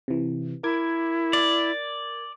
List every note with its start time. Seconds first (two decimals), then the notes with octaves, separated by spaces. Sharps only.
0.08 C3 E3
0.63 E4 A#4 D6 G#6
1.33 D5